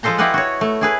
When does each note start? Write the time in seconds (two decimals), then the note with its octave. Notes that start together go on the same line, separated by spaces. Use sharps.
0.03 F3 G#3 F4 A4 C5 A#5
0.18 E4 F4 G4 B4 D#5 F#5
0.34 F#4 C#5
0.61 A3
0.81 E4 G#4 B4